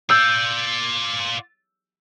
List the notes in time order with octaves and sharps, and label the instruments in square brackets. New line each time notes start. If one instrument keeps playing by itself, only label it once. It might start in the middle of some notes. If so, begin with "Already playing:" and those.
[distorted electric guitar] F4 D5 [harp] E6 G6